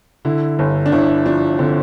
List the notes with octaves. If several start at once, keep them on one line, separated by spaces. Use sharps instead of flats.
D3 E4
G1
D4
G1 E4
F3 D4
D3 C4